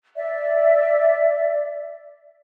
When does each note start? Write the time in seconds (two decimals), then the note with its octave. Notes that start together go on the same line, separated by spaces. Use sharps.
0.16 D5 E5